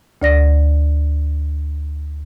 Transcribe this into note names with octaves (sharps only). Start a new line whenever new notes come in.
D2 D5 A#6